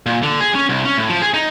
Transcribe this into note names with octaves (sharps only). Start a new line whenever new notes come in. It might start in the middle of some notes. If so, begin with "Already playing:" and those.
A#2
D3
G#4
C#4
C2
C#4
A2
F3
G#4
D#4